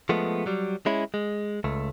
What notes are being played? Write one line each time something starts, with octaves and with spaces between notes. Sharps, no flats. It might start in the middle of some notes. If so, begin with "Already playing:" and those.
F3 G#3 A3 B3
F#3 G3
G#3 C#4 E4
G#3
C#2 A3